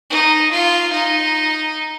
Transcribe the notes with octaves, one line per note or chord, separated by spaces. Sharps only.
D#4
F4
D#4